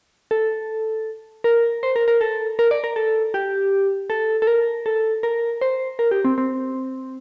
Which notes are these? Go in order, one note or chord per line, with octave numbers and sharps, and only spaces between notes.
A4
A#4
C5
A#4
A#4
A4
A#4
D5
A#4
A4
G4
A4
A4
A#4
A4
A#4
C5
A#4
G4
C4
C4